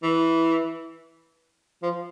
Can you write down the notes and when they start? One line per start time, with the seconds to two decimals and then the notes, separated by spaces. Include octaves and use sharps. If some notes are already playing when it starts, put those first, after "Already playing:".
0.03 E3
1.82 F3